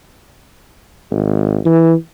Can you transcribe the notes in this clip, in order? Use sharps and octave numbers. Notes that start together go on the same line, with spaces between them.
G#1
E3